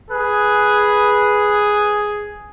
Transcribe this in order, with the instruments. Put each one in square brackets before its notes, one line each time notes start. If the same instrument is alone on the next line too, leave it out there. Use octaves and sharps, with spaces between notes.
[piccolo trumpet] G#4 [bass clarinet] B4